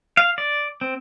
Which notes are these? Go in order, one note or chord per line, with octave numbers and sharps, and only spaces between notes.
F5
D5
C4